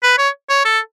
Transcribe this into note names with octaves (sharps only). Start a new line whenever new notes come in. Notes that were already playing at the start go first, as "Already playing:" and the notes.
B4
C#5
C#5
A4